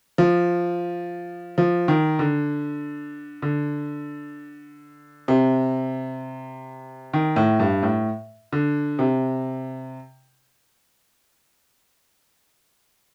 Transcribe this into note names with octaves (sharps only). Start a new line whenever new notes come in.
F3
F3
D#3
D3
D3
C3
D#3
A2
G2
A2
D3
C3